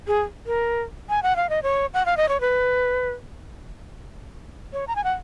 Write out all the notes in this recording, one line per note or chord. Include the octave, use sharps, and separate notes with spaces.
G#4
A#4
G#5
F#5
F5
D#5
C#5
F#5
F5
D#5
C#5
B4
C#5
A#5
G#5
F#5